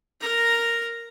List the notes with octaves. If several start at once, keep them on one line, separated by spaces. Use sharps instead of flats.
A#4 A#5